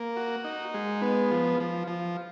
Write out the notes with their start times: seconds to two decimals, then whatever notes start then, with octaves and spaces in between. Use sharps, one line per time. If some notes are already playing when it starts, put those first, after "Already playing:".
Already playing: A#3
0.16 F#4
0.44 D#4
0.74 G#3
1.02 B3
1.31 F3
1.60 F3
1.88 F3